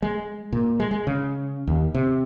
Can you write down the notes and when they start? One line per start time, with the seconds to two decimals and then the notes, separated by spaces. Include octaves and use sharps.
0.02 G#3
0.52 A#2
0.80 G#3
0.91 G#3
1.07 C#3
1.67 D#2
1.94 C3